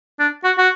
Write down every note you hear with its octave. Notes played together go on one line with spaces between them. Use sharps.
D4
F#4
F#4